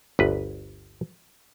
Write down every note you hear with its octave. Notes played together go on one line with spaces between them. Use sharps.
G1 D2 B4